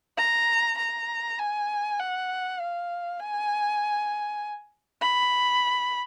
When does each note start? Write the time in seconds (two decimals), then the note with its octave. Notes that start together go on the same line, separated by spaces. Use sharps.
0.18 A#5
0.78 A#5
1.39 G#5
1.99 F#5
2.60 F5
3.19 G#5
5.01 B5